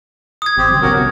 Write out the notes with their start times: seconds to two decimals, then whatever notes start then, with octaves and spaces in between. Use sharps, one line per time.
0.42 D#6 G#6
0.57 G#1 C4 G4
0.70 C#3 F#3 C4
0.82 C2 B3 C#4 F#4 A#4
0.95 C2 C#3 A3